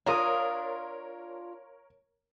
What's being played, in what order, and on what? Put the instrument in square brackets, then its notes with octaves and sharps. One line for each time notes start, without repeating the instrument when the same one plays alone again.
[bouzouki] D4 F4 [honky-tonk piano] A#4 C#5 [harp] A#5 D#6